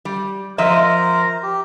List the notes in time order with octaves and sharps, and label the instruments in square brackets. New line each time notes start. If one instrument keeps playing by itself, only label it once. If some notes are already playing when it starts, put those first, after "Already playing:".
[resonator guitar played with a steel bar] G3
[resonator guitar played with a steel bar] F3 D#5 E5 [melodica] A#4 C5 A#5
[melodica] G4